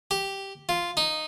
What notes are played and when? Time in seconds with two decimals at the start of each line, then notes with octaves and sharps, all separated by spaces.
0.11 G4
0.69 F4
0.97 D#4